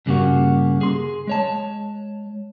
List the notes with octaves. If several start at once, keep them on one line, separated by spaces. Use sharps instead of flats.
G2 C#3 G3 A3 A#3 F#4
G#4 C6
G#3 C#5 A5